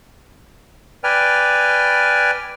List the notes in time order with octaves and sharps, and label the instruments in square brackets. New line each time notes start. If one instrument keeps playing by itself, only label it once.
[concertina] B4 D5 G5 G#5 F6